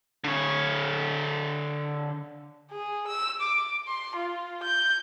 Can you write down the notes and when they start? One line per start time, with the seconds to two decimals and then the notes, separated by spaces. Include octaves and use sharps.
0.24 D3 C#5
2.71 G#4
3.07 E6
3.41 D6
3.87 C6
4.16 F4
4.63 G6